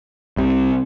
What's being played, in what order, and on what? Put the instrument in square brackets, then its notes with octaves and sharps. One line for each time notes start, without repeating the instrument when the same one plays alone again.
[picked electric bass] C2 C3